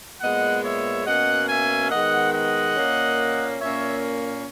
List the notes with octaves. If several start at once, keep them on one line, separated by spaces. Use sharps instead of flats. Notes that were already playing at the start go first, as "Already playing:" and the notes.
A#2 G#3 B3 D#5 F#5
C#5 E5
B2 A#3 C#4 D#5 F#5
E5 G#5
D#3 G#3 B3 D#5 F#5
D#5 F#5
A#2 A#3 C#4
A#2 A#3 C#4 C#5 E5